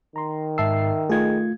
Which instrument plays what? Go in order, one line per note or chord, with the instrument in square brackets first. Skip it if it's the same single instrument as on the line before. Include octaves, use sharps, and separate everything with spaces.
[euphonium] D#3 [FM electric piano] A#5 C6
[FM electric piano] G#2 A5 C7 [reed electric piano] E5 E6
[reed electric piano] A3 F4 G#6 [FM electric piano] G#4 D#5